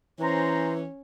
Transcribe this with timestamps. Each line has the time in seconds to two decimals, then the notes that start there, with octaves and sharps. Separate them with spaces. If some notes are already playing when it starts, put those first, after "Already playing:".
0.19 E3 C#4 C5 A#5